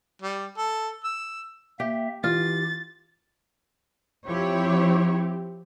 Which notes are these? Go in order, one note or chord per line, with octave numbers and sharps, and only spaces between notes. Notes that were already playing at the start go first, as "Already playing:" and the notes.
G3
A4
E6
A#3 G4 E5
E3 F4 G4 A6
F3 C4 E4 G4 C#5